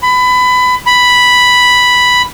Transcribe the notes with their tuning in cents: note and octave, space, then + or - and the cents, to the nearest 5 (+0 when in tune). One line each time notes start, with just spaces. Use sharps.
B5 +20
B5 +0